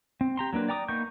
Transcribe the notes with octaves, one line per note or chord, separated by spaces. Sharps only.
C4
G4 A#5 C6
F#3 A#3 D4 B4
D5 G5 A#5 D6 D#6
A#3 B3 D#4 C#6 G6